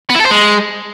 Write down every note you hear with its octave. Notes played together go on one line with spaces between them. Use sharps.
B3
E4
A4
C5
G#3